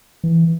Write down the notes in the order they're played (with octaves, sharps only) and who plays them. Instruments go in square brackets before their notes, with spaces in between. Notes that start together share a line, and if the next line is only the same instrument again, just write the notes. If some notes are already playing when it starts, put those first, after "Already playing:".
[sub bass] E3